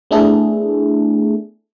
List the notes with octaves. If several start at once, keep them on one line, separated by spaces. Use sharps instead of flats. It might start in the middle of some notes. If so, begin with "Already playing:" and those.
A3 B3 D4 E4 G#4 A4